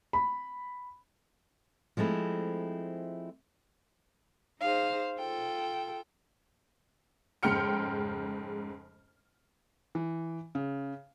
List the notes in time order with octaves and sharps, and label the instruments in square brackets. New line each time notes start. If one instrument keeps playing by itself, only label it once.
[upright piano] B5
[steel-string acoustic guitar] F3 G#3 A3 C4 E4
[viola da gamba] D#4 G#4 C5 [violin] F5
[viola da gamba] F4 A4 [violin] G5
[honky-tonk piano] F1 G#2 C#3 G5 F6 C#7
[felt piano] E3
C#3